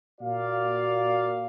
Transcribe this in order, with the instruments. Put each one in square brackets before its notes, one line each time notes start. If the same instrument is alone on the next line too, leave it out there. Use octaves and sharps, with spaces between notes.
[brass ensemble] A#2 F#4 A#4 D5 F5